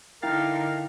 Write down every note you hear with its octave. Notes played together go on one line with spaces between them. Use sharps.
D3 D#4 E4 A#4 F5 G5 A6